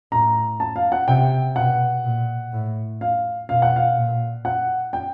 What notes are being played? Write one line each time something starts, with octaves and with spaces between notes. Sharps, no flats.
A2 A#5
A5
F5
F#5
C3 G5
B2 F#5
A#2
A2
F5
B2 F5
F#5
F5
A#2
F#5
G5